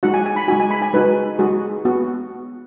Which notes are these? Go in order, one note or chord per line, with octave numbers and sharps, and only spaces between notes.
G#3 D#4 F#4 F#5
G#5
G#5
B5
G#3 D#4 F#4 G#5
G#5
B5
G#5
G#3 D#4 F#4 B4
G#3 D#4 F#4 G#4
B3 F#4